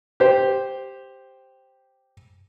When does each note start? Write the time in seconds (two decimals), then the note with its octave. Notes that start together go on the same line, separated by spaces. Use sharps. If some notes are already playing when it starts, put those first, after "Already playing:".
0.20 G4 C5